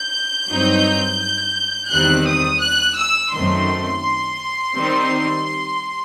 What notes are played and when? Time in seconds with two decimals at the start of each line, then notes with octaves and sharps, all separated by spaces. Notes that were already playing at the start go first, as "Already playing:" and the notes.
Already playing: G6
0.48 G2 F#3 C4 D#4
1.91 E2 D#3 G3 C4 F#6
2.27 D#6
2.62 F#6
2.98 E6
3.34 F#2 D#3 A3 C4 C6
4.76 D#3 G3 C4 D#4